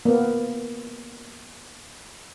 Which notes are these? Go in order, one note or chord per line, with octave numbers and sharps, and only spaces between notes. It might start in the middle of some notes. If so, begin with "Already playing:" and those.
A#3 B3